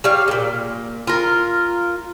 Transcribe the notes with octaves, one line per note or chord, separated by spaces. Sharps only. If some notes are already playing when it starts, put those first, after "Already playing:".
G3 C#5 F5
A#2 C#3
F4 A#4